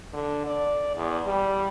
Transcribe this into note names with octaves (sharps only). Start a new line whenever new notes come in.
D3
D5
E2
G3